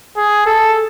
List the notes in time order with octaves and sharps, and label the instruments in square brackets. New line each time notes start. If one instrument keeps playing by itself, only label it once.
[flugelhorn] G#4
A4